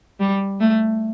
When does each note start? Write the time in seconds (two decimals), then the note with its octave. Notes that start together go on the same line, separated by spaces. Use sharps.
0.20 G3
0.60 A3